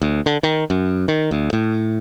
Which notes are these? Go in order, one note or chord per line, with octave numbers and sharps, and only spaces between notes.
D2
D3
D#3
F#2
D#3
D2
A2